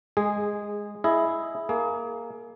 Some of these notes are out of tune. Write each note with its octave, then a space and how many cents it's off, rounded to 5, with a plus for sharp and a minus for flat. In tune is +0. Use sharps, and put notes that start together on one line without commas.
G#3 +0 G#4 -15
E4 +0 G#4 +10 D#5 +0
A#3 +0 G#4 +30